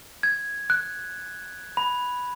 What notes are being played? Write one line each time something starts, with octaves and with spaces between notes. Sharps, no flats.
G#6
F#6
B5